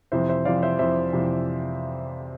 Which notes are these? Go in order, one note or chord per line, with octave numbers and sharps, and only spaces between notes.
F2 C3 E3 C5 E5
C5 E5
F2 C3 E3 D5 F5
C5 E5
F2 C3 E3 C5 E5
F2 C3 E3